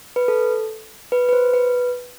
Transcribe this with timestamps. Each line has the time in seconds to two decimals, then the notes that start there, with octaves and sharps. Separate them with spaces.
0.16 B4
0.28 A4
1.12 B4
1.29 B4
1.33 C5
1.54 B4